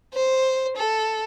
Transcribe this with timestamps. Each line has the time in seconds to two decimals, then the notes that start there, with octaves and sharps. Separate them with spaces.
0.14 C5
0.76 A4